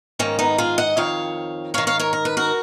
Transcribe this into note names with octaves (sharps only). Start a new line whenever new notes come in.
G#2 D#3 A#3 C#4
B3 D#4
F4 G#4
D#5 F#5
F2 D#3 C#5 F5
G#2 D#3 C#5 F5
C#5 F5
A#4 C#5
A#4
B4
F#4 A#4